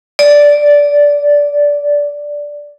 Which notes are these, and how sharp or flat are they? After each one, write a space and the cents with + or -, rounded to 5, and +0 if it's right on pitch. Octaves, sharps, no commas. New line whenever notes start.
D5 -5